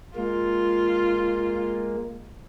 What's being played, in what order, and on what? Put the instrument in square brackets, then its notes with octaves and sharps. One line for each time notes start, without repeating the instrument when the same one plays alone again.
[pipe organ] G#3 A#3 [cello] F4